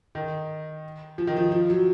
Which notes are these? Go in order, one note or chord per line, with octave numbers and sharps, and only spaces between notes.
D#3
F3
D#3
F3
F3
F#3